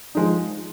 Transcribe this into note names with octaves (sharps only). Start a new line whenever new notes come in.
F3 G#3 D#4